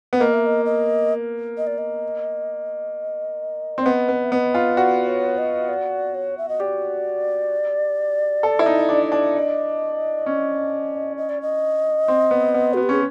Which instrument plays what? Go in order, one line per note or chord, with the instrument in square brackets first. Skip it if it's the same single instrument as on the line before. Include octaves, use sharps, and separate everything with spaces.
[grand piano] B3
[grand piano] A#3 [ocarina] D#5
[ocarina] E5
D#5
D#5
D#5
D5
D#5
[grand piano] C4
[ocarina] D5
[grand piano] B3 [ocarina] D#5
[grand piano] B3
[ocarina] E5
[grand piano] B3 [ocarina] D#5
[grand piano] F4
[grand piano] F#4 [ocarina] D5
[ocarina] C#5
D#5
D5
C#5
E5
D#5
[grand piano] G4 [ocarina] D5
[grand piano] A4
E4
D#4
D4
D4
[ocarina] D#5
[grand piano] C#4
[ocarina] D#5
D5
D#5
[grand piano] C4
B3
B3
[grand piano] B3 [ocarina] F#4
[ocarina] G4
[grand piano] C#4 [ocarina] G#4